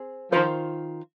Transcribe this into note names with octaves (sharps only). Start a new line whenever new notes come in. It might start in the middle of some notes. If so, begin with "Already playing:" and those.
Already playing: C4 G#4
D#3 F3 A#3 F4 C5